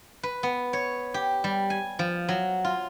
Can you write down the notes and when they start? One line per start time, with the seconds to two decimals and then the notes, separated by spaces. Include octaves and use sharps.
0.23 B4
0.43 B3
0.73 C#5
1.14 G4
1.44 G3
1.70 G#5
1.99 F3
2.28 F#3
2.64 F4